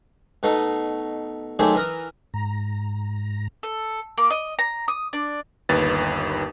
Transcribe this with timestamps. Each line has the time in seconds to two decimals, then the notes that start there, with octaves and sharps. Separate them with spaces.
0.43 B2 A3 D#4
1.59 D#3 F#3 A3 G#4 C5 D5
1.75 E3 A#4 D#6
2.34 G#2 A#5
3.63 A4
4.18 A#3
4.30 D#5
4.59 A#5
4.88 D#6
5.13 D4
5.69 G1 D#2 B4 A6